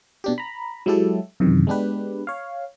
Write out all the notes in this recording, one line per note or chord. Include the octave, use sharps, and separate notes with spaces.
B2 D4 G4
A#5 B5
F#3 G#3 E4 G4 A4
F#2 C3 D#3 E3
G#3 B3 D4 G4 B4
C#5 F5